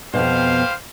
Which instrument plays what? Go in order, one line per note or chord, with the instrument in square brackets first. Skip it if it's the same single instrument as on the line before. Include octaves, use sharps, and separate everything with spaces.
[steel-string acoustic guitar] F2 G#2 B2 [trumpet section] G3 C5 F5